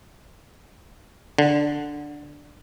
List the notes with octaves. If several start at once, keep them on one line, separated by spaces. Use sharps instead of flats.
D3